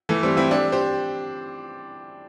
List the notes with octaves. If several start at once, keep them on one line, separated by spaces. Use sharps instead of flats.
E3 A3
G3 C4
C4 E4
D4 G4
G4 C5